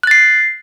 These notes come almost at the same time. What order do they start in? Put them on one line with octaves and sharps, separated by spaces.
F#6 A6 C7